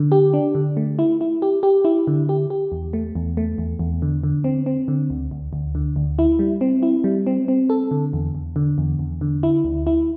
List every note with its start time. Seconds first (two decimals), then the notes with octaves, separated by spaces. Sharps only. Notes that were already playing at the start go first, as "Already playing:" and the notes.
Already playing: D3
0.12 G4
0.33 D4
0.55 D3
0.77 A3
0.99 E4
1.21 E4
1.42 G4
1.63 G4
1.85 E4
2.07 D3
2.29 G4
2.50 G4
2.72 E2
2.93 A3
3.15 E2
3.37 A3
3.58 E2
3.79 E2
4.02 D3
4.23 D3
4.44 C4
4.66 C4
4.88 D3
5.10 D2
5.31 D2
5.53 D2
5.75 D3
5.96 D2
6.19 E4
6.39 G3
6.61 C4
6.83 E4
7.04 G3
7.27 C4
7.48 C4
7.70 A4
7.91 D3
8.13 E2
8.35 E2
8.56 D3
8.78 E2
8.99 E2
9.21 D3
9.43 E4
9.65 D2
9.87 E4